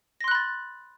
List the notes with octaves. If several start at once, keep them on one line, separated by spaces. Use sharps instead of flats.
B5 C6 F#6 A6 A#6